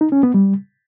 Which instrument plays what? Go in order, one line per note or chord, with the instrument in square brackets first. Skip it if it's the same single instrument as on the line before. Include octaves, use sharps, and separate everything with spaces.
[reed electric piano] D#4
C#4
B3
G3